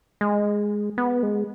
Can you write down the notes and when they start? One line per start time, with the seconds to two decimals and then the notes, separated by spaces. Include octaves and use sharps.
0.21 G#3
0.98 B3
1.23 G#3